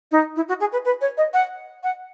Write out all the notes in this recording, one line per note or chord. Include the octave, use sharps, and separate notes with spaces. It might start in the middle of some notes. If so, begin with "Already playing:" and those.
D#4
E4
F#4
G#4
B4
B4
C#5
D#5
F#5
F#5